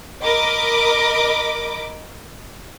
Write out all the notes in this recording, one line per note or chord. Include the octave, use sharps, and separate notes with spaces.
A#4 D#5 B5 D6